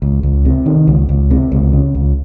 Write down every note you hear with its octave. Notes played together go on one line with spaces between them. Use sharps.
C#2
C#2
C3
D#3
C#2
C#2
C3
C#2
C#3
C#2